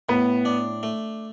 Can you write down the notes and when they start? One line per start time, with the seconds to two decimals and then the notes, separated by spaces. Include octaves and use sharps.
0.09 A2 B3
0.45 D4
0.83 A3